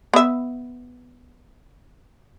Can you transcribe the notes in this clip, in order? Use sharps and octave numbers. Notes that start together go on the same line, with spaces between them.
B3 E5